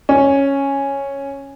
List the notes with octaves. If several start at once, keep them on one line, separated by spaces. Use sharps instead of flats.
C#4